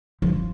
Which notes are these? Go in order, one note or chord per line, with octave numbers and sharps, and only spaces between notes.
F3